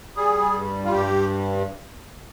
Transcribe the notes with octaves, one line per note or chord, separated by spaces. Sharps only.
G3 G#4
G2
F4
G2 G4